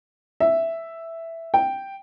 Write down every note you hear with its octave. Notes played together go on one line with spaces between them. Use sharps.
E5
G5